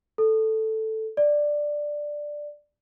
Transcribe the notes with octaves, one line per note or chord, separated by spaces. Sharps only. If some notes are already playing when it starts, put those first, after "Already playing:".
A4
D5